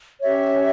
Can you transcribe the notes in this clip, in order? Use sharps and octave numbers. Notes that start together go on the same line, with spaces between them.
C#4 G4 C#5 E5